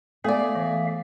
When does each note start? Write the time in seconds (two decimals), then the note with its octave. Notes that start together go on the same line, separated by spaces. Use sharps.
0.24 A3 B3 G#4 D5 E5 F5
0.55 E3